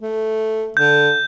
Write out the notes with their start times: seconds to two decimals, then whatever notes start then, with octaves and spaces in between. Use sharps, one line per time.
0.02 A3
0.77 D3 G6